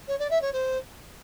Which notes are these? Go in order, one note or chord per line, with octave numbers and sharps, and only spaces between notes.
C#5
D5
E5
C#5
C5